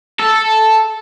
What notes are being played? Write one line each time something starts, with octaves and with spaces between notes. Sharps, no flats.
A4